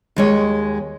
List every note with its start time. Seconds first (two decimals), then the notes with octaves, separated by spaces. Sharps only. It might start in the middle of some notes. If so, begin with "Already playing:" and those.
0.16 D#2 G#3 C#5